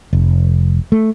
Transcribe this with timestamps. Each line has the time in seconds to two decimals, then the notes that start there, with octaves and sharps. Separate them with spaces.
0.13 F1
0.92 A3